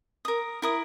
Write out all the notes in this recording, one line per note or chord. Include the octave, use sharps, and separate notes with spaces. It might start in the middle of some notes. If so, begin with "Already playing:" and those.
A#4 D#6
E4 A#4 D#6